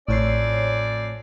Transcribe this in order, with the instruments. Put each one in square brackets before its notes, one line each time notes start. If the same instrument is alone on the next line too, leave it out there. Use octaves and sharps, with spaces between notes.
[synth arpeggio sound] A1 [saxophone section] F2 C#4 D5 [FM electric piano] A2 C#5 C7